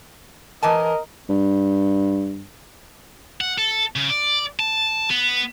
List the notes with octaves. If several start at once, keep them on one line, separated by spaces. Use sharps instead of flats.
E3 A#4 D#5 G#5 A5
G2
F#5
A4
C#3
D5
A5
B3